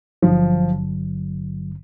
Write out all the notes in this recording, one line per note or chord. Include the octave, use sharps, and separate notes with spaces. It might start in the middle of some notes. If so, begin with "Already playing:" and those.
G#1 G2 D3 F3 F#3